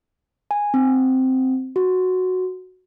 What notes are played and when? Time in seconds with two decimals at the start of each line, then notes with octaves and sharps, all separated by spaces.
0.51 G#5
0.74 C4
1.76 F#4